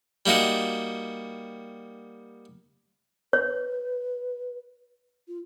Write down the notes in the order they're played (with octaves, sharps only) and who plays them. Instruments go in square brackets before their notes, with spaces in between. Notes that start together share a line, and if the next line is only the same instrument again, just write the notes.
[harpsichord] G3 A#3 D#4 F#4
[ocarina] B4 [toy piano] C#5
[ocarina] F4